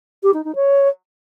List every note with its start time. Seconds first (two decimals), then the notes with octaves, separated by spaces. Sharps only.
0.23 G4
0.34 D#4
0.45 D#4
0.55 C#5